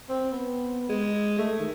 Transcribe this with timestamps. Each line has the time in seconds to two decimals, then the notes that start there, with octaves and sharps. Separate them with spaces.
0.09 C4
0.32 B3
0.89 G#3
1.38 A3
1.60 D#3